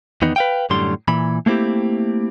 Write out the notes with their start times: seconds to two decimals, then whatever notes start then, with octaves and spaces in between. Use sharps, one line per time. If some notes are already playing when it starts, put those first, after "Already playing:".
0.22 E2 D#3 B3 D#4
0.36 B4 F5 G5
0.70 F#2 A2 D3 G3 C6
1.08 A#2 E3 B5
1.46 A3 A#3 C4 E4 G4